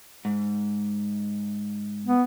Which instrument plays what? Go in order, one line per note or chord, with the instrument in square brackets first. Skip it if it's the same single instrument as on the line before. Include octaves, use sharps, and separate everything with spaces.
[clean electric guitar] G#2
[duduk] B3